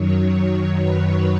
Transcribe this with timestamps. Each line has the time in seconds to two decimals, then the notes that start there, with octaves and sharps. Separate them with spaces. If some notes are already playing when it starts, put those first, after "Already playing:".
Already playing: F#2 D#3 F#3 C#5
0.35 C#5
0.78 B4